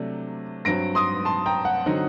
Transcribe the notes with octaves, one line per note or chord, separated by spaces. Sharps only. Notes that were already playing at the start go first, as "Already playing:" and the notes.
Already playing: C3 F#3 A3 D4
G2 F#3 C4 A#6 D7
C6 D#6
A5 C6
G5 A#5
F#5
D3 F#3 C4 D#4